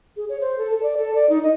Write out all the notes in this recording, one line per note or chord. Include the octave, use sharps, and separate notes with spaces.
G#4
C#5
C5
A4
A4
D5
A4
D5
D#4
D#5